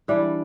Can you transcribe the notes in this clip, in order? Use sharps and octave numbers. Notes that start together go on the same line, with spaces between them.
E3 G3 D4